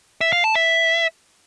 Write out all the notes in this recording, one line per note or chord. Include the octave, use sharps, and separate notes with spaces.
E5
F5
A5
E5